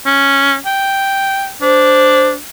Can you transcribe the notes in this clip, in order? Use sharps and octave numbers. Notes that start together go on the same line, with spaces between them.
C#4
G5
D4 C5